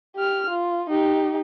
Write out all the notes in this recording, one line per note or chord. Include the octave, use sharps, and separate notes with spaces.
G4 F6
F4
D#4 G4